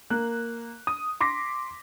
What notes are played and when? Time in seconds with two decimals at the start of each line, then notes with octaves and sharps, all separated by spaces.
0.10 A#3 F#6
0.87 D#6
1.21 C6 D6 A#6 B6